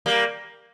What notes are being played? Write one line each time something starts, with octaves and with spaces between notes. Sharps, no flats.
G3 A#3